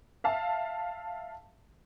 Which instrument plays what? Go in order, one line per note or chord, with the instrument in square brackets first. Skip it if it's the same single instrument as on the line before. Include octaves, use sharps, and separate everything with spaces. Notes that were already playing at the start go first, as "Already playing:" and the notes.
[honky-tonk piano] E5 F5 A5